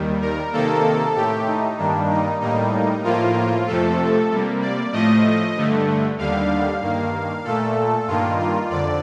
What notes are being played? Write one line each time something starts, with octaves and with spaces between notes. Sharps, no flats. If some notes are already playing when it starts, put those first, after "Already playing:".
Already playing: D#2 D#3 G3
A#4
C3 D#3 A#3 A4
A2 A3 G4
D#4
G2 D#3 G3 A#3 D4
D#4
A2 G3 A#3 D#4
A2 F3 A#3 F4
F2 C3 F3 A3 A4
C3 G3 A#3
D5
A2 F3 A3 D#5
G2 D3 A3
D#2 D3 G3 F5
G2 D#3 A#3
A#2 A3 A4
G2 D#3 A#3 F4
F4
F2 D3 D5